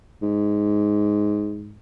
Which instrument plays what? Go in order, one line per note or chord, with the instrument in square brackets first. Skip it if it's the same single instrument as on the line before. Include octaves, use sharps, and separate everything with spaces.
[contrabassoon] G#2